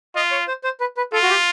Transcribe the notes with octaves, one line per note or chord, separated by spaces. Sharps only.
F4 D#5
C#5
C5
C5
B4
B4
F4 A4
F#4
G4